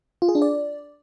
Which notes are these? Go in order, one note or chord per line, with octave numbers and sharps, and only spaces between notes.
F4
G#4
D4
D5